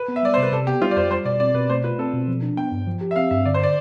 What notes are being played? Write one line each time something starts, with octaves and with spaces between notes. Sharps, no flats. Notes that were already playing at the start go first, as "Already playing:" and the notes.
Already playing: B4
B3
E5
G3 D5
C3 C5
B4
C3 A4
B3 G4
G3 F4
D5
F2 C5
G3 C5
B2 D5
C4 D5
B2 B4
A3 C5
F4 B4
C4 A4
B2
F3
D4
B3 G5
G2
F3
G4
E5
C4 F5
G2 E5
D3 D5
C5
D5